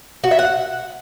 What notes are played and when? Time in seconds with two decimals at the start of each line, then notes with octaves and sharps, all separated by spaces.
0.24 F#4
0.31 E5
0.39 F#5